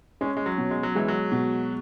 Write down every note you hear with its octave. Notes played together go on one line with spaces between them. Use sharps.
G#3 C#4
G#3
F#3
B2
G#3
F#3
E3 G#3
F#3
B2